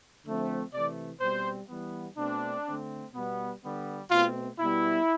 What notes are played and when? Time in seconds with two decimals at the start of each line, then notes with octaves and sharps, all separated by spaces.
0.24 D3 F3 A3 C4
0.72 C3 E3 A3 D5
1.21 B2 G3 C4 C5
1.69 E3 G3 B3
2.17 B2 A3 C4 D4
2.66 D3 A3 C4
3.14 B2 G3 B3
3.62 D3 G3 B3
4.11 B2 A3 C4 F4
4.59 B2 G3 B3 E4